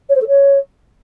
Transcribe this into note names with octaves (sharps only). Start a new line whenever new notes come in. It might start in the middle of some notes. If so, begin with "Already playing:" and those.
C#5
C5
A4
C#5